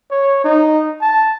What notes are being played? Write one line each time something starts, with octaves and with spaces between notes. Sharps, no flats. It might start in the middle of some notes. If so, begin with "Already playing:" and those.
C#5
D#4
A5